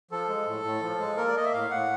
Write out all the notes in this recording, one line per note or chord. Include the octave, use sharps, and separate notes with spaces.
F3 A4
G#3
A2
A2
F3
G#3
A#3 A#4
D5
A#3 D#5
E5
A2 F5
A2 F#5